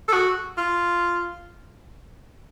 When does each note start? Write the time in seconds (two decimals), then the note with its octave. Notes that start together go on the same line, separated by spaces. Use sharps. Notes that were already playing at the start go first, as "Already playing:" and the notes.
0.08 A4
0.13 F#4
0.58 F4